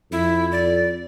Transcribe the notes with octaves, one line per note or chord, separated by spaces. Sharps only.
F2 E4
D5